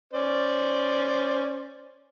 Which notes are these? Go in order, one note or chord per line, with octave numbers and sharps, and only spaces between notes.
C#4 C5 D5